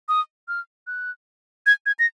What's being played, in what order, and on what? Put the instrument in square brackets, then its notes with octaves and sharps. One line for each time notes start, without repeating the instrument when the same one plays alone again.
[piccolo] D#6
F6
F#6
G#6
G#6
A#6